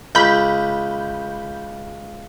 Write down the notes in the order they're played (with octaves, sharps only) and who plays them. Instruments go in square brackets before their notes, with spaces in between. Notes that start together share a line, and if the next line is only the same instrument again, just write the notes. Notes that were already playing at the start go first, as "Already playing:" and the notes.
[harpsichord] C#2 [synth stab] B5 G6